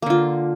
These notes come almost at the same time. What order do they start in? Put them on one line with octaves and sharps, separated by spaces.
A#3 D3 F4